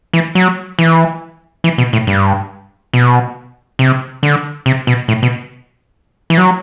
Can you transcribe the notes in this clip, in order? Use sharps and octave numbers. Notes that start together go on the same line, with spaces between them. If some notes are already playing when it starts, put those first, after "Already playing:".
E3
F#3
E3
E3
B2
A2
G2
B2
C3
D3
C3
B2
A2
B2
E3
F#3